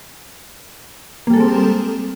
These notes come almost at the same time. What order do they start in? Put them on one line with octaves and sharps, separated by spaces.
A#3 G3 A4 G#3 C4